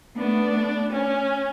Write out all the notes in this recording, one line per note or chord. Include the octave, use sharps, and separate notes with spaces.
A3 B3 D4
C#4